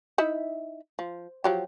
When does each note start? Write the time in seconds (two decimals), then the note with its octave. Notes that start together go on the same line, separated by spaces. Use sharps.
0.18 D#4 E4 E5
0.99 F3
1.44 F3 F#3 G4